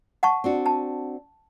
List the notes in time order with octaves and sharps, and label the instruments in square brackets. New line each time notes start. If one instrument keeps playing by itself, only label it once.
[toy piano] F#5 A5 C#6
[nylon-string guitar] C4 D4 F#4
[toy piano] A5